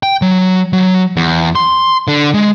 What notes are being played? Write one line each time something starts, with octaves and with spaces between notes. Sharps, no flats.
G5
F#3
F#3
E2
C6
D3
G#3